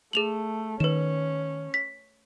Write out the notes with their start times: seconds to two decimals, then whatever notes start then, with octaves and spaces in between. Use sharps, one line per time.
0.13 A3 G#4 F7 F#7
0.80 D#3 C#4 B4 E7
1.74 B6